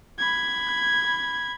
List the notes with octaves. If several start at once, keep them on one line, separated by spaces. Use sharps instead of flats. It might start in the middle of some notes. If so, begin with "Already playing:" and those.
B5 G#6